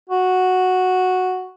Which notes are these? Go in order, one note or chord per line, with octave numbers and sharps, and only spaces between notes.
F#4